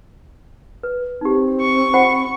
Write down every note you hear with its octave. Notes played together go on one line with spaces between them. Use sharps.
B4
C4 D#4 G4
C#6
F4 C5 F#5